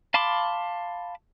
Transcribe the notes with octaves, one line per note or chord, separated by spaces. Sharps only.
F5 A5 B5 C6 D6